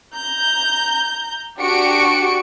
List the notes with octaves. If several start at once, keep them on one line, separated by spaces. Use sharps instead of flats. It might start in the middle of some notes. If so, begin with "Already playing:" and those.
A#5 G6
D4 F#4 G4 C#6 C#7 D7